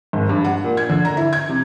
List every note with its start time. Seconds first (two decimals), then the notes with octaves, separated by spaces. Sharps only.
0.13 G#1
0.29 G2
0.44 F#5
0.64 A#2
0.77 G#6
0.89 D3
1.05 A#5
1.17 E4
1.33 G#6
1.49 C3